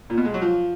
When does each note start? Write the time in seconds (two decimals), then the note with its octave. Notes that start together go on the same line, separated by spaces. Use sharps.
0.10 A#2
0.17 B2
0.25 G#3
0.34 F#3
0.42 F3